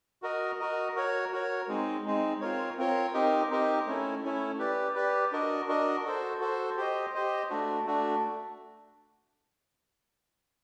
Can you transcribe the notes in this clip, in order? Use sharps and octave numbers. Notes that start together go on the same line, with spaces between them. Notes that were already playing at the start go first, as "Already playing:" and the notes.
F#4 A#4 D#5
F#4 A#4 D#5
F#4 A#4 C#5
F#4 A#4 C#5
G#3 C4 D#4
G#3 C4 D#4
C4 F4 A#4 C#5
C4 F4 A#4 C#5
C4 D#4 G4 A#4 D#5
C4 D#4 G4 A#4 D#5
A3 C#4 E4
A3 C#4 E4
G4 B4 D5
G4 B4 D5
D4 F#4 A#4 D#5
D4 F#4 A#4 D#5
F#4 A4 C5
F#4 A4 C5
G4 C5 D#5
G4 C5 D#5
A3 D4 F#4
A3 D4 F#4